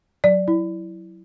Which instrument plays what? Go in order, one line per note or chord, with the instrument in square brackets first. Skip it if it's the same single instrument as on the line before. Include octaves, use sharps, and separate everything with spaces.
[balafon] F#3 D5
E4